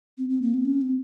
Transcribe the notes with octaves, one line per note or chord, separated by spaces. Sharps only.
C4
C4
A#3
C4
C#4
C4